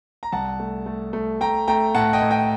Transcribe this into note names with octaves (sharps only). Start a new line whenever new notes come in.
A#5
C2 F#5 A5
A3
A3
A3
A3 G5 A#5
A3 G5 A#5
A2 F#5 A5
D#5 G5
A2
D#5 G5